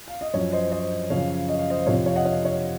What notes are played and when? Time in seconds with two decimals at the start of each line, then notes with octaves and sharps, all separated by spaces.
0.08 F5
0.21 D#5
0.34 F#2 F3 C#5
0.52 C5 D#5
0.72 C5 D#5
1.10 F#2 C#3 F3 C#5 F5
1.48 D#5
1.59 F5
1.70 C5 D#5
1.86 F2 C3 F3 C#5 F5
2.06 C#5 F5
2.16 D#5 F#5
2.25 C#5 F5
2.45 C#5